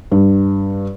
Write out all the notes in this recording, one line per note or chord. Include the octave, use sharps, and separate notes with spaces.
G2